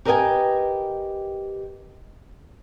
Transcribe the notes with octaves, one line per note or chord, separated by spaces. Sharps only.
G4 A#4 B4 D#5 G5 G#5